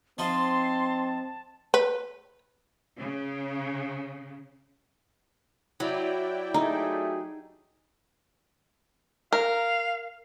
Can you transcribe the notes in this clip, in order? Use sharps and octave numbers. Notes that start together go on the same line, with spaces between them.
F3 C4 D#4 F4 A5 C6
B4
C#3
F#3 E4 D5 G5
A3 D#4 G4 G#4
A#4 F5